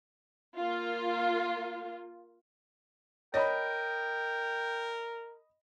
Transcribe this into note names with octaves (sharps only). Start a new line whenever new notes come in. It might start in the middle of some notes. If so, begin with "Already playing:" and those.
A#3 F4
A#4 C#5 D#5 G5 B5